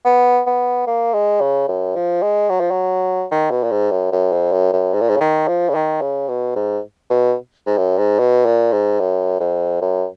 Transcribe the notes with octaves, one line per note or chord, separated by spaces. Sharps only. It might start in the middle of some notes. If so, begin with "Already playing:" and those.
B3
B3
A#3
G#3
C#3
F#2
F3
G#3
F#3
F3
F#3
D#3
B2
A#2
G#2
F#2
F#2
F2
F#2
F#2
G#2
A#2
G#2
C#3
D#3
F3
C#3
D#3
C#3
B2
G#2
B2
G#2
F#2
G#2
B2
A#2
G#2
F#2
F2
F#2